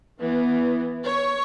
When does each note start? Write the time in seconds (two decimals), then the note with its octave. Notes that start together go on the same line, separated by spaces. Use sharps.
0.20 E3 B3
1.05 C#5